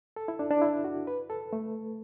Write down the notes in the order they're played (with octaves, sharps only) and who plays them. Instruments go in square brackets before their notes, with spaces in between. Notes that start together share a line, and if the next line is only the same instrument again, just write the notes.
[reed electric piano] A4
E4
D4
D4
E4
F#4
B4
A4
A3